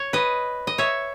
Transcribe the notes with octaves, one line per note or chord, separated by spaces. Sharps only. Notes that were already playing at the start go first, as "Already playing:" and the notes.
Already playing: C#5
B4 D#5
D#5
C#5 E5